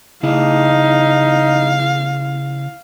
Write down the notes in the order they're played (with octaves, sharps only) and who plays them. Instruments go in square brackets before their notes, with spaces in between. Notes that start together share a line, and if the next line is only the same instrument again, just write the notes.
[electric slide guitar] C#3 E4 G#4 [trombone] D#4 [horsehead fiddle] F5